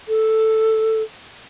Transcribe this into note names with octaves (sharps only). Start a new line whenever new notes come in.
A4